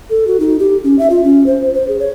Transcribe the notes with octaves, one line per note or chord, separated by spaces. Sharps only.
A4
F#4
D#4
G4
C#4
E5
F4
C#4
C5
C5
G#4
C#5